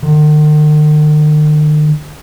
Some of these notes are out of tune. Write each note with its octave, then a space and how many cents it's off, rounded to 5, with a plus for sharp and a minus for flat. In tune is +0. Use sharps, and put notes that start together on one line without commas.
D#3 -45